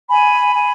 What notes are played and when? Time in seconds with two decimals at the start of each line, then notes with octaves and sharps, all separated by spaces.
0.09 G#5 B5
0.54 G#5